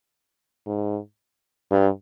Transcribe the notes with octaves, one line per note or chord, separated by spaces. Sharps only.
G#2
G2